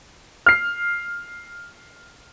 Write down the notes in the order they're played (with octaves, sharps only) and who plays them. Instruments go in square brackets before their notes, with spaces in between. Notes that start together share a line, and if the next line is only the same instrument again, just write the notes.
[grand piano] F6 C7